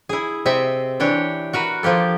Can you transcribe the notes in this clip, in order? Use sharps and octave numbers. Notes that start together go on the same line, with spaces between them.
E4 G#4
C3 C4 D#5 E5
E3 D4 G4 C#5
F#4 A#4 B4
F3 A#3 G4 A4